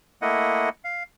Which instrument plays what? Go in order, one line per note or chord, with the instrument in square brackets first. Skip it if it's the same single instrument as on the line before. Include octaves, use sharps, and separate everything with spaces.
[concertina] A3 A#3 E4 D#5 F#5
F5